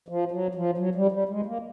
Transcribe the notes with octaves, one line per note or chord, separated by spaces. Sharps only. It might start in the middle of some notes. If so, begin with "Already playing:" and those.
F3
F#3
F3
F#3
G3
G3
G#3
A#3